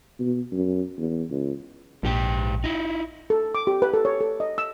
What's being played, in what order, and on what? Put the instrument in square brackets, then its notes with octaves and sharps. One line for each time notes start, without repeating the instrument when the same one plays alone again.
[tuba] B2
F#2
E2
C#2
[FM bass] A#1 [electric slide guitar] G#2 G4 G5
[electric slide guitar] D#4 E4
[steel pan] A4
D6
G4
B4
A4
C#5
A4
D#5
E6